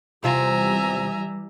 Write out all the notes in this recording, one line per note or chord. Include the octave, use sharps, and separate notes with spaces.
E2 C3 E3 G3 F4 E5 G#5 A#5